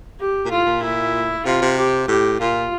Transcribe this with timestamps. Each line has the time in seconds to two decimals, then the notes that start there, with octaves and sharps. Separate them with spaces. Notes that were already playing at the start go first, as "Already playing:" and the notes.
0.20 G4
0.45 A#2
0.50 A2 F4
0.66 A#2
0.82 E4
1.45 C3 F4
1.62 C3
1.77 G4
2.08 A2 G4
2.40 A#2 F4